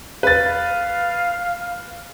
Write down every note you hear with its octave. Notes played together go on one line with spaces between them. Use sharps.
B4 F5 A6